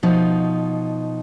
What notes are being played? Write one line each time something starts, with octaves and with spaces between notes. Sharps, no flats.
B2 F3 D#4